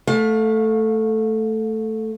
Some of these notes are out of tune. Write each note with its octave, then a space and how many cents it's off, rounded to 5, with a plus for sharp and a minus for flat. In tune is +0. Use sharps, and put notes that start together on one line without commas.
A3 +0 F5 +30